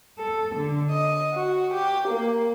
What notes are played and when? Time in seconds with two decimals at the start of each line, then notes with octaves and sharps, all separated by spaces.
0.19 A4
0.56 D3
0.90 D#5
1.34 F#4
1.72 G4
2.07 A#3